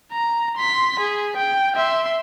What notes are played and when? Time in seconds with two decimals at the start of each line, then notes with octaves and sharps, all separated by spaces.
0.12 A#5
0.57 C6 B6
1.00 G#4
1.37 G5
1.76 E5 C6